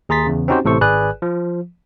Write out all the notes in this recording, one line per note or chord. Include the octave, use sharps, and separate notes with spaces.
D#2 G#4 A#5 C6 A6 B6
E2 C#3
C4 C#4 D#4 F#4 G4 C5
A1 A2 C3 A4 C5 C#6
G#1 G#4 B4 D5 G#5 F#6
F3